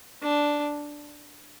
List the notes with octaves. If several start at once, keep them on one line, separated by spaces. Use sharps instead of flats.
D4